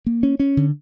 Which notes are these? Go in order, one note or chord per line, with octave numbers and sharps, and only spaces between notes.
A#3
C#4
C#4
D3